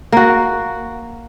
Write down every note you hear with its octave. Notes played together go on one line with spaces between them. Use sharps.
A#3 F#4